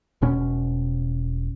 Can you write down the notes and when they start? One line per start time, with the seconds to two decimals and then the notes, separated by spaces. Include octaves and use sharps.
0.22 E1 B2 C#4